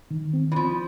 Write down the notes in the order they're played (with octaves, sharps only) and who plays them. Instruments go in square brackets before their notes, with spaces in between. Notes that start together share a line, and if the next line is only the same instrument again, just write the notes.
[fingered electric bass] D#3
C4
[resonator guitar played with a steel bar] E3
[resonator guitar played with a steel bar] F3 [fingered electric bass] C4